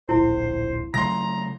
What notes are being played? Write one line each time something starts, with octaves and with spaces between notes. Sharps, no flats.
D1 A#1 E4 C5
C#3 F#3 A3 A#5 C6 A#6